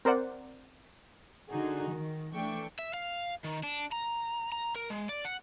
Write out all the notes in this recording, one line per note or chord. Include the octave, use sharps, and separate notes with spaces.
C4 A#4 C5 D5 F#5
D3 D#4 F#4 G#4
D#3
E3 A3 D4 G5 C#6
E5
F5
D#3
D4
A#5
A#5
A#4
G#3
D5
F#5